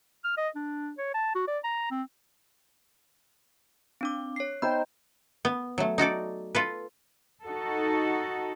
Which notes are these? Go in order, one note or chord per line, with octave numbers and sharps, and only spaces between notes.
F6
D#5
D4
C#5
A5
F#4
D5
A#5
C4
C4 D4 D6
C#5 C7
B3 D#4 C5 G5 B5 G6
B3
F#3 A3
D#4 F#4 A4 D5
F4 A4 B4
D#4 F#4 A4